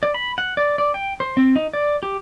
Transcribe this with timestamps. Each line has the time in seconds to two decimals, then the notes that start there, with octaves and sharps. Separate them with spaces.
0.03 D5
0.14 B5
0.38 F#5
0.57 D5
0.78 D5
0.94 G5
1.20 C5
1.37 C4
1.56 D#4
1.74 D5
2.03 G4